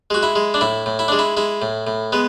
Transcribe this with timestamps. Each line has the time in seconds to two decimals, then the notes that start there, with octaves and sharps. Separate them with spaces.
0.10 G#3 F#4
0.23 E4
0.36 G#3
0.54 D4
0.61 A2 E4
0.86 A2
0.99 E4
1.08 G#3 D4
1.19 E4
1.37 G#3 E4
1.62 A2
1.87 A2
2.13 G#3 B3